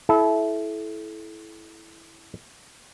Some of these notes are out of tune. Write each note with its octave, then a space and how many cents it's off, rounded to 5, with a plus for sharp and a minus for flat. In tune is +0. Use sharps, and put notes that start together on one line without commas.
E4 +0 A4 -30